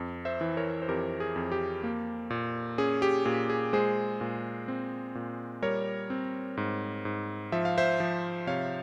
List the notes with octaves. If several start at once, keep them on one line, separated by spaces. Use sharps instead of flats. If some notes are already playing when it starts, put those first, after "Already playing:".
Already playing: F2
C5 E5
E3
A#4 C#5
C5
F2 G4 A#4
G#4
F2
G4
A#3
A#2
C#4 G#4
G4
A#2 G#4
G#4
G#3 G#4 C5
A#2
C4
A#2
G3 A#4 C#5
C4
G#2
G#2
F3 E5
F5
C5 E5
F3
C3 C#5 F5